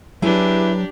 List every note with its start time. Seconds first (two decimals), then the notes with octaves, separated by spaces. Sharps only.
0.22 F#3 D4 E4 G4 G#4 B4